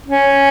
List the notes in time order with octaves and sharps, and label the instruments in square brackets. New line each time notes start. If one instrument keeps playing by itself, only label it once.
[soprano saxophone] C#4